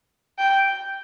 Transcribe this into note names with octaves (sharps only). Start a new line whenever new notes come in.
G5